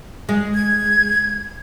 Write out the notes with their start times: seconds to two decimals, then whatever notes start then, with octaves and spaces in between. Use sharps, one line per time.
0.29 G#3
0.54 G#6